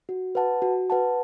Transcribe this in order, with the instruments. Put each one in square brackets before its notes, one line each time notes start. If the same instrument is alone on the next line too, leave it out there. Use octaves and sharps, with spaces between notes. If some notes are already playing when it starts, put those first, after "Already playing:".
[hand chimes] F#4
B4 F#5 A5
F#4
B4 F#5 A5